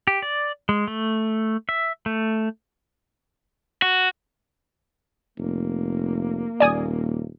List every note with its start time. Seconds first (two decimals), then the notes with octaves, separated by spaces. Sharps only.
0.07 G4
0.22 D5
0.69 G#3
0.88 A3
1.69 E5
2.06 A3
3.82 F#4
5.38 F1 A#3
6.60 D#1 D5 G#5 D#6